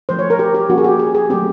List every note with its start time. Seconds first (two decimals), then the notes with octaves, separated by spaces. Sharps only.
0.09 F3 A3 C#4 C5
0.19 C#5
0.30 A#4
0.39 G4
0.54 G4
0.69 F3 A#3 C#4 F#4
0.78 G#4
0.84 G4
0.99 G#4
1.15 G#4
1.30 F#3 A3 C4 G4